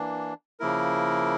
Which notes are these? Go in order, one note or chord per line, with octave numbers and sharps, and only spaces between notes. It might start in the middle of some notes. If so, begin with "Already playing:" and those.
Already playing: E3 A#3 D4
C#3 F3 A#3 E4 A#4